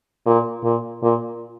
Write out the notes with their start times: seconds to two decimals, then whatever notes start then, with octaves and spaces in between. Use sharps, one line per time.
0.26 A#2
0.64 A#2
1.03 A#2